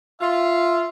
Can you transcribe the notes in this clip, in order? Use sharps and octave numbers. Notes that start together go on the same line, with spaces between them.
F4 E5